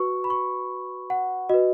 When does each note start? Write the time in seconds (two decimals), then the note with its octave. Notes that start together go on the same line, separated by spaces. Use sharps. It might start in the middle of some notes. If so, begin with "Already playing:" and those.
Already playing: F#4 B4 C#6
0.24 B5
0.30 C#6
1.10 F#5
1.49 F#4 B4 D#5